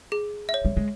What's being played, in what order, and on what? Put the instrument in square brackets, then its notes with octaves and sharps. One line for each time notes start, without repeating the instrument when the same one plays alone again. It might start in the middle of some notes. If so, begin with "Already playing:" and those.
[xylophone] G#4
E5
C#5
[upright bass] G3
G#3